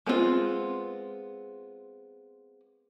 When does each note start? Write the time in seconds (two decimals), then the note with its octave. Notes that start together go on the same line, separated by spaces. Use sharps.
0.06 G#3 B3 C4 D4 F4